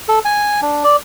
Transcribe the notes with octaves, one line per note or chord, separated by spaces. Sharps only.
A4
G#5
D4
D5